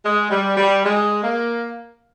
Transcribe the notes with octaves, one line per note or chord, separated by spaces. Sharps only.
G#3
G3
G3
G#3
A#3